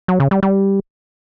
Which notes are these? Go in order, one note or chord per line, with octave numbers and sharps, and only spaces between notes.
F#3
C#3
G3
G3